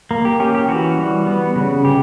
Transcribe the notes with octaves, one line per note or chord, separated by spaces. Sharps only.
A#3
G4
C#4 G4
G4
E3 F#4
G3
B3
C#3
C#3 G4